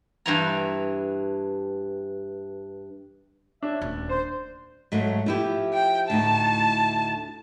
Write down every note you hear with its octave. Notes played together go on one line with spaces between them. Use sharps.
G2 E3 A#5
D4 C#5 E5
D#1 D2
C5
G#2 F#3 A3
F3 E4 G4
G5
D2 A2 D#4 A5